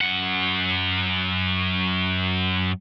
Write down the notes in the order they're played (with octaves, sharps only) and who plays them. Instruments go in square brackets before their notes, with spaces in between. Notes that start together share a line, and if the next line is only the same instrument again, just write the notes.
[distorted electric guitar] F#2 F#5